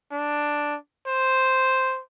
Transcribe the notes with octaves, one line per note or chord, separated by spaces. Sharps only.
D4
C5